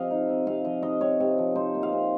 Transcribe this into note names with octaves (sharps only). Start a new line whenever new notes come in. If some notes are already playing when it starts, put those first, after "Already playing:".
Already playing: C3 F3 C4 D#5 F5
D#4
C4
C3 F5
F3 D#5
D#4 D#5
C4 C#5
C3
F3
D#4 C5
A#3
F5
C3